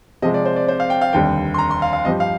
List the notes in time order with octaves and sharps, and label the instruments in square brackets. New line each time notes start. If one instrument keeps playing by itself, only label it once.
[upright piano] C3 F3 G#3 [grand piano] D#5
[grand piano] D5
C5
D5
C5
F5
G5
F5
[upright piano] F1 D#2 D3 G3 [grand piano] G5
[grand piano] C6
A#5
C6
F5
F5
[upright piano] G2 F3 C4 G4 [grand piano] D#5
[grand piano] F5